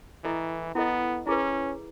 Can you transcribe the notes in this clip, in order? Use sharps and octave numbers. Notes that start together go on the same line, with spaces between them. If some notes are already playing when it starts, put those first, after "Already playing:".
E3 E4 A4 D#5
B3 E4 A4 D#5
C#4 E4 G#4 B4